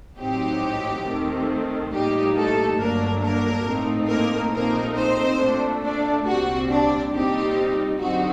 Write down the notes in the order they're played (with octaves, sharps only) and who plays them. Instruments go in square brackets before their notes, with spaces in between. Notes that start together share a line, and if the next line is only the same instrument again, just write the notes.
[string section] A1 A2 F#3 C4 D#4 G4
D#2 D#3 A3 C4
A#1 A2 G3 A#3 D#4 G4
A3 A4
G1 G2 F#3 A3 A#3 D4 A#4
A#3 A#4
A2 A3 C4 D#4
A#3 A#4
A#1 A#2 A3 A#3 C4 D#4 A#4
C4 C5
A#2 A3 D4
D4 D5
C2 A#2 G3 C4 F#4 F#5
D4 D5
A#2 G3 C4 D#4 G4
F#2 D3 G3 C4 D#4 F#4